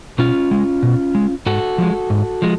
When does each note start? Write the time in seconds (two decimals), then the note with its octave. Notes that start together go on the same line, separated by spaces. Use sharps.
0.19 B2 C#4 F4
0.51 G#3
0.83 B2
1.15 G#3
1.46 G#2 F#4 A4
1.78 F3 G#3
2.10 G#2
2.42 F3 G#3